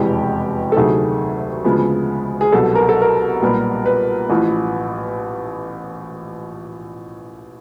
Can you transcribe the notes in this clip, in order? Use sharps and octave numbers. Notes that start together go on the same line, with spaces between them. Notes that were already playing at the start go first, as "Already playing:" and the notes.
Already playing: F1 E2 B2 G#3 G4
A4
D2 C3 D#3 F#3 A3 G#4
D2 C#3 F3 G#3 B3
G#4
C2 B2 F#3 A4
A#4
A4
A#4
B1 A#2 G3 B3
B4
A1 A2 F3